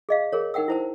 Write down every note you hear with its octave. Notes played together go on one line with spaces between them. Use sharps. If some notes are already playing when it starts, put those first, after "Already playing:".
G#4 D#5 F5
G#4 A#4 C#5
D#4 A#4 F#5 G5 E6
E4 C5 A5